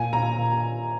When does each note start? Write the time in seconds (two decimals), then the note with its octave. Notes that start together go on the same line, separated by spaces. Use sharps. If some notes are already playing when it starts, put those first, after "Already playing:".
Already playing: A#2 G#5
0.13 A#2 A#5
0.38 A#2